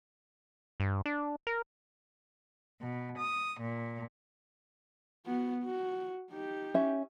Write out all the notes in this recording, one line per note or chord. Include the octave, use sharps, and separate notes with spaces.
G2
D4
A#4
B2
D#6
A#2
B3 F#4
F#4
D#4 G4
C#4 E5